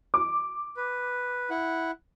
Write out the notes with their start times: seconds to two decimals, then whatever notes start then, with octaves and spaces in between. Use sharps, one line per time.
0.14 D6
0.77 B4
1.50 E4 F#5